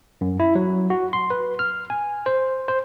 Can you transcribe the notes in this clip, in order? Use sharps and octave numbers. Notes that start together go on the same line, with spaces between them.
F#2
E4
F#3
F#4
C6
B4
F6
G#5
C5
C5